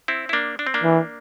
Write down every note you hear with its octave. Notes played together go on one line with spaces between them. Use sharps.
C4 E4
E4
A#3 D4
D4
C4
A#3 D4
E3